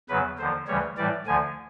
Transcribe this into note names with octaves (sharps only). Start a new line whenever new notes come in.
E2 C#3 F#3 B4
D#2 D3 F3 C5
D2 C#3 E3 G3 C#5
A2 E3 G3 D5
D2 D3 F3 G#5